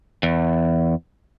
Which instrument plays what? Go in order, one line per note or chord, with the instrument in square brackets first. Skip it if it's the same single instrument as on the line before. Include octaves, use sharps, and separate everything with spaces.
[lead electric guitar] E2